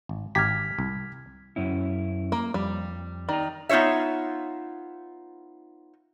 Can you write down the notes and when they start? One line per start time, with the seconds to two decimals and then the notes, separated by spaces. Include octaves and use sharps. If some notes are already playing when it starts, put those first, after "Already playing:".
0.09 G#1
0.35 G#1 G4 A#5 F6 G#6 B6
0.79 C2
1.56 F#2 C#4 E4
2.32 A#3
2.54 F2 G3
3.29 D#3 D5 A#5
3.69 B3 D#4 F4 C#5 E5